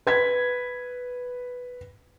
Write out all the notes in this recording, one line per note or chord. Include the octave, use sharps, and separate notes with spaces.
B4 G#6 B6